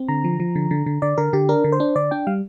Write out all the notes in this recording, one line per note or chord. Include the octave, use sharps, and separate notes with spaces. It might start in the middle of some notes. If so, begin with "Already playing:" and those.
Already playing: C4
D3 A#5
F3
F3
D3
D3
D3
D3 D5
D3 A#4
D3 G4
D4 A#4
D3
C5
D4
D3 D5
D4 G5
G3 F5